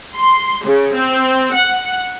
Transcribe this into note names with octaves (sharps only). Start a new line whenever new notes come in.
C6
C#3
C4
F#5